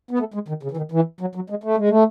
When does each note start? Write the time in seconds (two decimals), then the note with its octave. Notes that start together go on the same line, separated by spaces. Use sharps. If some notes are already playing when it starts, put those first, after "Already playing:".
0.11 B3
0.19 A3
0.34 G#3
0.48 D#3
0.63 C#3
0.71 E3
0.77 D#3
0.92 E3
1.21 F#3
1.35 F#3
1.50 G#3
1.64 A3
1.77 G#3
1.89 A3